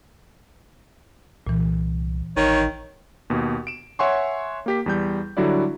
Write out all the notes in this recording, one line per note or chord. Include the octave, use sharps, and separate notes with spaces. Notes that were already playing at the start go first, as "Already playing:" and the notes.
C2 A#2 E3
A1 D#3 C#5
D#2 B2
D7 E7
C#5 E5 F#5 G#5 C6 C#6
A#3 G4 B6
E2 G3 G6
D3 F#3 G3 E4 F#4 D5